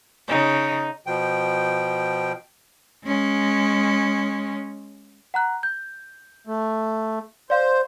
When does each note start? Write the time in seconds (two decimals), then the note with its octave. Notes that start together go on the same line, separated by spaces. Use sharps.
0.28 C#3 D#4
1.06 B2 F3 G5
3.04 G#3 C#4
5.34 F#5 A#5 F#6
5.63 G6
6.47 A3
7.50 C5 D5 F5